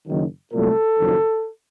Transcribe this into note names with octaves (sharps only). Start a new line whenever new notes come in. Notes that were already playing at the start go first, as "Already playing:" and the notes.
F#1 F#2 D#3
C2 A#2 F#3 A3 A4
F#1 F2 D#3 F#3